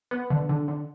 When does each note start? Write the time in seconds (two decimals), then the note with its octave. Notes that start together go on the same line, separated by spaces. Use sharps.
0.11 B3
0.30 D3
0.49 D3
0.68 D3